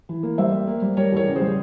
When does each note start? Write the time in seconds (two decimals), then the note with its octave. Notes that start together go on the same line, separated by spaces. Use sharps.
0.09 E3
0.23 A#3
0.38 G3 C5 E5
0.52 A#3
0.67 A#3
0.82 G3
0.97 G3 A#4 C#5
1.12 E2 A#4 C#5
1.27 C#3
1.36 G#4 C5
1.41 G3